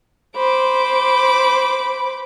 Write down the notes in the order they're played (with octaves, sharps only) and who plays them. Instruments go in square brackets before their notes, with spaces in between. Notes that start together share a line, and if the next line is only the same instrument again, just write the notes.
[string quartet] C5 B5 D6